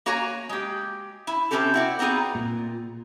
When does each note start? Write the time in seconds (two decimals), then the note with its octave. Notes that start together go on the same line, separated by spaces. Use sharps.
0.06 A#3 F#4 C#5 G#5 A#5
0.49 G#3 G4
1.27 E4
1.51 C3 G3 C4 C#4 G4 A4
1.74 E4 F#4 D5
1.99 B3 C4 D#4 F4 G#4
2.35 A#2